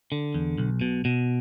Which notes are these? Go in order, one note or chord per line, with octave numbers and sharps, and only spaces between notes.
D3
E2
B1
B2
B2